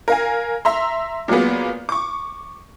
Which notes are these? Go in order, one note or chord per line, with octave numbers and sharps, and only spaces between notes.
A#4 F5 G#5
E5 A#5 C6
A#2 F#3 G#3 A#3 B3
C#6 D6